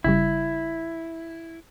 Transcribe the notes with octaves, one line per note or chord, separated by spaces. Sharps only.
G1 C#3 G3 E4